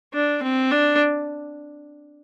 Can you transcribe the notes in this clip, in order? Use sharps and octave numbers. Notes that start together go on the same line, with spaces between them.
D4
C4
D4